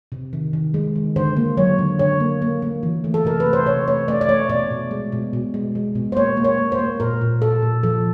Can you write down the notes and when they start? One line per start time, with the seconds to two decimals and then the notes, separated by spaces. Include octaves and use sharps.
0.12 C3
0.33 D#3
0.53 D#3
0.74 G#3
0.96 D#3
1.16 D3 C5
1.37 A#3
1.57 F#3 C#5
1.79 D3
1.99 D3 C#5
2.20 A#3
2.42 A#3
2.62 A#3
2.83 E3
3.04 A3
3.14 A4
3.25 C3 A#4
3.40 B4
3.46 A3
3.53 C5
3.66 C3 C#5
3.87 A3 C#5
4.08 A3 D5
4.21 D5
4.29 A3 C#5
4.49 B2 D5
4.70 B2
4.91 G#3
5.12 B2
5.33 B2
5.54 G#3
5.75 G#3
5.95 B2
6.12 C5
6.17 A#3 C#5
6.37 A#3
6.44 C#5
6.58 A#3
6.72 C5
6.79 A#3
7.00 A#2 A#4
7.21 A#2
7.42 A#2 A4
7.62 A#2
7.83 F3 A4